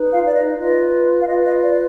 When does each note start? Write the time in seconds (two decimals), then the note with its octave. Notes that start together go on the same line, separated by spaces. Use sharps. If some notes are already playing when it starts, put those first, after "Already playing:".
Already playing: D#4 B4
0.11 F4 F5
0.27 D5
0.34 D#5
0.58 F4 B4 D#5
1.20 F5
1.28 F4 B4 D#5
1.45 D#5
1.62 D5